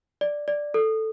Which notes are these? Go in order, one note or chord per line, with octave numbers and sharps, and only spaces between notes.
D5
D5
A4